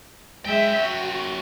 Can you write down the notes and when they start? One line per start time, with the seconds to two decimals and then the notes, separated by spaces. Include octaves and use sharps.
0.45 F#2 G#3 E5 G5
0.80 F#4